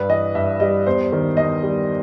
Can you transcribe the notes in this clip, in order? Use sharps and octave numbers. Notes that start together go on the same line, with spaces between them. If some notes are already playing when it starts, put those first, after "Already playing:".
Already playing: G2 B4
E3 D#5
G2 E5
G3 D#5
E2 C5
D#3
E2 D#5
G3